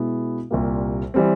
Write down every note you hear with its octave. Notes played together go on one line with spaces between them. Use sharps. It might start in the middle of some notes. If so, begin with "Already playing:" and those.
Already playing: B2 G#3 B3 E4
C2 A#2 G3 A#3
E3 G3 C4